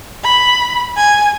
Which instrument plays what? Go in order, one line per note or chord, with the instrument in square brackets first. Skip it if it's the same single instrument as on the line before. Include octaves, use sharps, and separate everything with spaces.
[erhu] B5
G#5